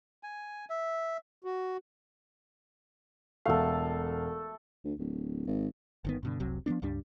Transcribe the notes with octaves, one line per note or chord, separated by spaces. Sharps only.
G#5
E5
F#4
E1 A3 A4 F5
D2
D1
G#1
G1 D#3 B3
G2 B2 D3
F1 C2 C3 F#3
F3 F#3 B3 D4
C#2 G2 G3 D4